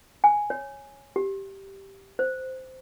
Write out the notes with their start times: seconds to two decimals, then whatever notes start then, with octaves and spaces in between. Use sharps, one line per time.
0.24 G#5
0.50 C#5
1.16 G4
2.19 C5